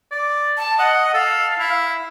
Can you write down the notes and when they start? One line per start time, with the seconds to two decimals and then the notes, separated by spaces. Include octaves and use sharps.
0.11 D5
0.57 A5
0.79 D#5 F#5
1.14 A4 F5
1.59 E4